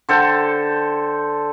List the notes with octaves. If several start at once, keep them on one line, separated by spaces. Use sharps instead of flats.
D3 A4 C5 G5